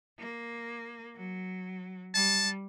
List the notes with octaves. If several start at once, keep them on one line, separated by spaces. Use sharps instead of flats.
A#3
F#3
G3 A5